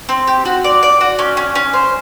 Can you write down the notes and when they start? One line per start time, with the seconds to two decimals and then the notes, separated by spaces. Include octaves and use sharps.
0.09 C4
0.27 G4
0.45 F#4
0.64 D5
0.83 D5
1.01 F#4
1.19 C#4
1.37 C#4
1.55 C#4
1.73 C5